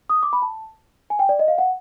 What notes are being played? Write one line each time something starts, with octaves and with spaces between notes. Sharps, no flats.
D#6
D6
B5
A5
G#5
G5
D5
D#5
F5
F#5